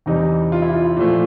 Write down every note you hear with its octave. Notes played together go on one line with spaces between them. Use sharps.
E2 C3 E3 G3 D#4
F4
E4
F4
A#2 F3 A3